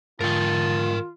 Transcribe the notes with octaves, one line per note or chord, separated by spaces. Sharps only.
G#2 D3 F4 A#4 G5 A5